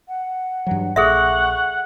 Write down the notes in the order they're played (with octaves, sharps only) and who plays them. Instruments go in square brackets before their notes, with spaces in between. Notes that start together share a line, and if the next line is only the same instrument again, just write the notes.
[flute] F#5
[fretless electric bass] G2 E3 F#3
[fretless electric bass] A#1 [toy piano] G#4 A4 E5 [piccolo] F#5 [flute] C#6